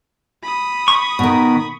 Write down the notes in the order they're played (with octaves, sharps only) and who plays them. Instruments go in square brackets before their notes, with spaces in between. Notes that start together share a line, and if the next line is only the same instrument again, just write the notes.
[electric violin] B5 D#6
[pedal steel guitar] C#6
[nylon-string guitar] B2 D#3